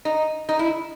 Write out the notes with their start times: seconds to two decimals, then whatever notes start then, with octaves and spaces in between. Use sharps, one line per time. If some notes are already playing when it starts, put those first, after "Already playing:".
0.05 D#4
0.49 D#4
0.59 E4